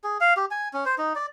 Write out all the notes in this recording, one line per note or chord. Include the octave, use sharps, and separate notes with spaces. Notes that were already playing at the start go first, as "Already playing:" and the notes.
G#4
F5
G4
G#5
C#4
C5
D#4
D5